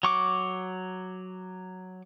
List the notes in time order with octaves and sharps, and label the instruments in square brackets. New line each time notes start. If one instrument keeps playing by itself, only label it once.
[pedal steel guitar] F#3 C#6 D6